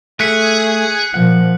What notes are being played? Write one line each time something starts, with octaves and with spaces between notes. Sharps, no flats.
A3 G#4 F#6 B6 C#7
A#2 F3 F#5